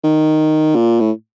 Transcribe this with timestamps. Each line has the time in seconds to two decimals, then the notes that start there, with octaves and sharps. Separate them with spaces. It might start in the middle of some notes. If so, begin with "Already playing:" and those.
0.04 D#3
0.75 A#2
1.00 A2